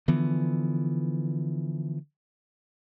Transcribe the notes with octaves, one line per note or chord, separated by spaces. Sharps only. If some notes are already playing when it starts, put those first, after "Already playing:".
D3 E3 F3 B3